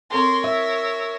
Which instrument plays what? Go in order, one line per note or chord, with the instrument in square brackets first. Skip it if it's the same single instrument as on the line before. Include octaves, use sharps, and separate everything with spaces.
[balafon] C4 A4 A5 [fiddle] A#4 C#5 [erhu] C6
[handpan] E5 [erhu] E6